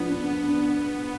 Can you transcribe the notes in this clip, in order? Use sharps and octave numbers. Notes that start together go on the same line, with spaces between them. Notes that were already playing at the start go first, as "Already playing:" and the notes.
Already playing: F3 B3 D4
D4
D4
D4